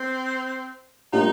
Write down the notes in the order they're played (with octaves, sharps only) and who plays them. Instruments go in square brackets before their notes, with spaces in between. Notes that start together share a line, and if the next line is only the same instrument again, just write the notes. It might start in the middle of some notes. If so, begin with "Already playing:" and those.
Already playing: [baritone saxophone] C4
[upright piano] A2 G3 A#3 D4 F4 [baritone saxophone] D#4